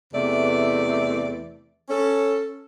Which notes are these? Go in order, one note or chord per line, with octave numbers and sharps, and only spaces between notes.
E2 C3 E3 A3 D5
C#4 A4